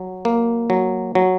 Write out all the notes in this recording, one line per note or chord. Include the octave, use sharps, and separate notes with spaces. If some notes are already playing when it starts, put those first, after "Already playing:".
Already playing: F#3
A#3
F#3
F#3